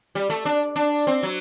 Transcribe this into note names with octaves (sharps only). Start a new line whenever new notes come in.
G3
A3
D4
D4
C4
F#3